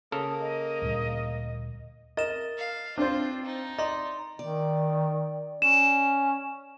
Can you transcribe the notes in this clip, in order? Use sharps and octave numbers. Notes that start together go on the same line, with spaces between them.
C#3 A#3 A4 A#4 D#6
D#5
D2 A#2 G3
A#4 D#5 A6 E7
F5
C4 D4 F4 C5
D#4
D5 D#5 A#5 C6
D#3 D5
C#4 E7